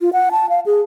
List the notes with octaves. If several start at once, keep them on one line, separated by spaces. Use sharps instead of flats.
F4
F#5
A5
F5
G#4